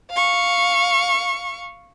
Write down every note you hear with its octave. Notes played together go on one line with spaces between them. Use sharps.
F5 C#6